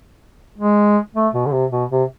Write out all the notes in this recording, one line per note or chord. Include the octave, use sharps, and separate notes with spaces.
G#3
A3
B2
D3
C3
B2
C3